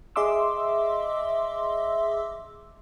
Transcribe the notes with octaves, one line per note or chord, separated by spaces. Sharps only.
G#4 D#5 E5 C6 D6 E6